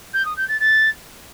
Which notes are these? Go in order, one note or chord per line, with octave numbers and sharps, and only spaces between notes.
G6
D#6
G6
A6
A6